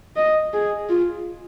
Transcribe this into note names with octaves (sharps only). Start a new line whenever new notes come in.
D#5
G#4
F4